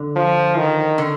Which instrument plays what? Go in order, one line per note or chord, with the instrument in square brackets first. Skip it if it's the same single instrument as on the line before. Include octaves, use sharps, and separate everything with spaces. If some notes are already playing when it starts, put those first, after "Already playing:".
Already playing: [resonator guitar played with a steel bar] D3
[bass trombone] F3
D#3
[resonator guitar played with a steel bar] D3